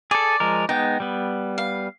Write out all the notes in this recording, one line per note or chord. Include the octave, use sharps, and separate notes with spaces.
G#4 A4 D5
F3 G#3 A#4
G#3 B3 D#4 G5
G3 B3
F5